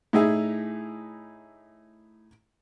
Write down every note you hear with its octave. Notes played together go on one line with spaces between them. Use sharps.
A2 D#4 E4 G#4